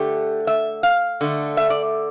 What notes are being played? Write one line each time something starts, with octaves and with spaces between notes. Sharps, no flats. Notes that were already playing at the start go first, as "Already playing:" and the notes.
Already playing: D3 A3 G4
E5
F5
D3 A3
E5
D5